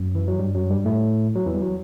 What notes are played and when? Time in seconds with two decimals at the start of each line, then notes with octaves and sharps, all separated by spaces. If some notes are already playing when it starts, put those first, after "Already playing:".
Already playing: F#2
0.15 E3
0.28 F#3
0.39 G2 G3
0.55 F#2 F#3
0.70 G2 G3
0.85 A2 A3
1.36 F#3
1.46 E2 E3
1.55 G3
1.61 F#3